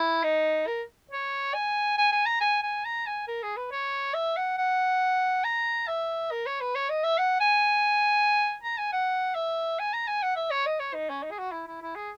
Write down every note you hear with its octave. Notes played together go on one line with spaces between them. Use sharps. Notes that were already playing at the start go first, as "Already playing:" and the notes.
Already playing: E4
D#4
A#4
C#5
G#5
G#5
G#5
A#5
G#5
G#5
A#5
G#5
A#4
G#4
B4
C#5
E5
F#5
F#5
A#5
E5
A#4
C#5
B4
C#5
D#5
E5
F#5
G#5
A#5
G#5
F#5
E5
G#5
A#5
G#5
F#5
E5
C#5
D#5
C#5
D#4
C#4
D#4
G#4
F#4
E4
E4
E4
G#4